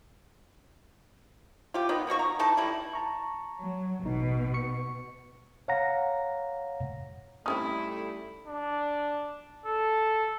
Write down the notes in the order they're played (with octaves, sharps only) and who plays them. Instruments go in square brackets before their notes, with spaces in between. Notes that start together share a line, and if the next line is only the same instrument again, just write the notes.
[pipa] F4 G4
D#3 B3 D#4
B2 A#3 F#4 C#6
A#5
D#3 E3 D#4 A5
G3 A3 E4
[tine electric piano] A5 A#5 C#6
[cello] F#3
[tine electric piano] A1 D#4 [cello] B2
[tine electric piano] C#6 C#7
C#5 F5 F#5 A#5 A#6
[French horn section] G3 A3 [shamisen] C4 C#4 D#4 [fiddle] E4 [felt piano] D#6
[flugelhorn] D4
A4